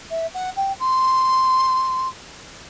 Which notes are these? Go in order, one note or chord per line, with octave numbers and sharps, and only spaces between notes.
E5
F#5
G5
C6